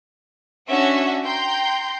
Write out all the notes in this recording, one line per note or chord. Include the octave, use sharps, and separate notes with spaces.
C#4 D4 F#4 E5 F#5
G5 A#5 C6 G6